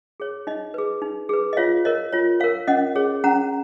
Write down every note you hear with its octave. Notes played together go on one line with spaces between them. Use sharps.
G#4 C#5
D#4 D#5
G#4 B4
D#4
G#4 B4
D#5
F4 C#5 F5
A#4 C#5 D#5
F4 C#5
A#4 C#5 F5
C#4 D#5 F#5
G#4 C#5
C#4 F#5 A#5